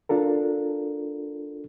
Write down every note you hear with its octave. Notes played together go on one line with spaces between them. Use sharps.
D4 F4 A4 A#4